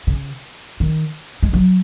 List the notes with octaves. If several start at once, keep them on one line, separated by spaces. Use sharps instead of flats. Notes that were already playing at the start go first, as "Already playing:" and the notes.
C#3
D#3
G#3
F#3